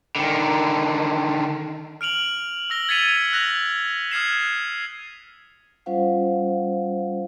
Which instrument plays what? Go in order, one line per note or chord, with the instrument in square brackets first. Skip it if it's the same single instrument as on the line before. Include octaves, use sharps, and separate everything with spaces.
[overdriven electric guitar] D3 D#3
[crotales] F6 D7 F7 F#7
E6 A#6 F#7 G7
G#6 A6 B6 C#7 D#7 F7
E6 F#6 A#6 F7
D#6 F6 G#6 C7 E7
[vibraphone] G3 C#4 F4 C5 F5 F#5